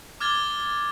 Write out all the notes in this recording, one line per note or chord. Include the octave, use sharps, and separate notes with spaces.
D6 F6 G#6 A6 G7